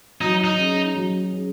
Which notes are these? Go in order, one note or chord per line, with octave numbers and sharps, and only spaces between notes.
F#3 D#4
D#4
C#4 G#4
F#3
C#4 G#4